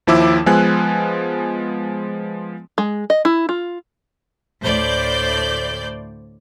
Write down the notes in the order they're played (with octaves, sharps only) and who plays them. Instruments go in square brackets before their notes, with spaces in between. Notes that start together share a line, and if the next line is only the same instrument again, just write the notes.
[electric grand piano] D#2 F3 E4 D6 E6
F3 G#3 B3 G#5 F#6
[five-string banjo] G#3
D#5
E4
F4
[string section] D2 A2 C5 D5 G6